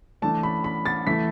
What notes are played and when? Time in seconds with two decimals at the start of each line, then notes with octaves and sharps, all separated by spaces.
0.22 E3 A3 D4 A5
0.43 B5
0.64 B5
0.86 A6
1.07 E3 A3 E4 B6